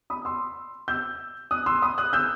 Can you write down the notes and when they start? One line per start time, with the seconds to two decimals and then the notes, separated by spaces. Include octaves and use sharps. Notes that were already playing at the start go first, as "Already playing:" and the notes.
0.10 B5 D#6
0.25 C6 E6
0.88 E6 G6
1.51 D#6 F#6
1.66 C6 E6
1.82 B5 D#6
1.98 D#6 F#6
2.13 E6 G6